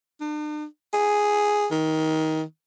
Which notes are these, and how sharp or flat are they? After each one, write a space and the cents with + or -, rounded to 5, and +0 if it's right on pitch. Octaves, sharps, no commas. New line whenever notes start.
D4 +45
G#4 +0
D#3 +20